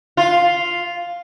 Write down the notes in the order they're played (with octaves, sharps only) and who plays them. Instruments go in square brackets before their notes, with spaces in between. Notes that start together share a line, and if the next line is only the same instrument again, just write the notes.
[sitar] F4